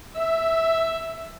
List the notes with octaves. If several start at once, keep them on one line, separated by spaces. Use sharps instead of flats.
E5